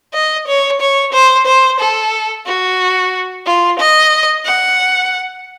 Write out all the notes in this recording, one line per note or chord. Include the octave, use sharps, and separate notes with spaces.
D#5
C#5
C#5
C5
C5
A4
F#4
F4
D#5
F#5